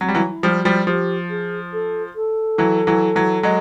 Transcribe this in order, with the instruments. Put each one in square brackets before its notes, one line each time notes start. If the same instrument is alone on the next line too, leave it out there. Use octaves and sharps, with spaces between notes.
[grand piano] F#3 [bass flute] C4
[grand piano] G3
E3 F#3
[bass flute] E4
[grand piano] F3 G3
[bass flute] F#4
[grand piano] F3 G3
[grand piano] F3 [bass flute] G4
[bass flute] G#4
A4
A4
[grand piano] E3 F#3
E3 F#3
E3 F#3
F#3 G#3